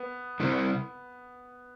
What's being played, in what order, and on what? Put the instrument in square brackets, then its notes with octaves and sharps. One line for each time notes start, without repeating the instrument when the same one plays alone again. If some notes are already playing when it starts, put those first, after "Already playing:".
Already playing: [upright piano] B3
[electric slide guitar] C3 G3 C4 E4